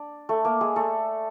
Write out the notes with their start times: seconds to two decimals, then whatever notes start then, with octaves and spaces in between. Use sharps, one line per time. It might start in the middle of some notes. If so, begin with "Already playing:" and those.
Already playing: D4 D5
0.29 A3 A4
0.45 A#3 A#4
0.61 G#3 G#4
0.76 A3 A4